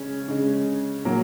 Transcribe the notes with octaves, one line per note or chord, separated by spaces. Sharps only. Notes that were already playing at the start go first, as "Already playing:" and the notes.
Already playing: C#3 G#3 C#4
C#3 G#3
A#2 F#3 A#3